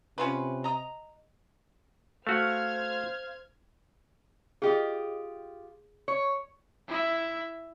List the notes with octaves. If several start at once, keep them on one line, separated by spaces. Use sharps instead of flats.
C3 C#4 F4 B4
D#5 A#5
A3 F#4 C5 F5 F6 G#6
F4 G4 G#4 D#5
C#5
E4 E5